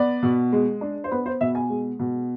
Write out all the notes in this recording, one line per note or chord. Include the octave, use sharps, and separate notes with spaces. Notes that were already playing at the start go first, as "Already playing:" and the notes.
Already playing: B3 D5
B2
G#3
D4
C5
B3 B4
C5
B2 E5
G#5
G#3
B2